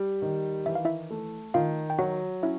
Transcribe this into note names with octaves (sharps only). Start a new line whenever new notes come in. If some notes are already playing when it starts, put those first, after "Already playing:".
Already playing: G3
D#3
E3 E5
F5
E4 E5
A3
D#3 F4 F5
G5
F#3 F#4 F#5
C#4 E4 E5